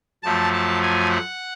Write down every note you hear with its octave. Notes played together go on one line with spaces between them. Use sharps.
F#2 F3 A3 A5
A5
G#5
F#5